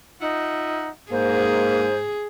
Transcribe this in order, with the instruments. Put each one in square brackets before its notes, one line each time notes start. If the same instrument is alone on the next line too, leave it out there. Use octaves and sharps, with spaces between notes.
[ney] D#4 [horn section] F4 E5 F#5
[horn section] G#2 [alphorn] A#3 [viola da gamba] G#4 [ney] C5